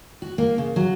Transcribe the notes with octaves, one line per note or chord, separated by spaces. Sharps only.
F#4
A#3
C#3
F#3